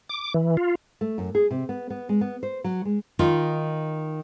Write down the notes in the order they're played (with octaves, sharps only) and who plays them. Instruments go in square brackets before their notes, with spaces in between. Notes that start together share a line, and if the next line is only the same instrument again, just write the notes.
[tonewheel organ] D6
E3
F4
[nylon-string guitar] A3
F#2
G#4
C3
B3
B3
G#3
B3
C5
F#3
G#3
D#3 D#4 F4